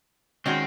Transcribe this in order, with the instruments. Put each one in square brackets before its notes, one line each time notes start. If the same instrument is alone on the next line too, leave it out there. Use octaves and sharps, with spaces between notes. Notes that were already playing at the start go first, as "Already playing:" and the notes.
[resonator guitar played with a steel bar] D#3 G#3 C#4 F#4 [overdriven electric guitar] C4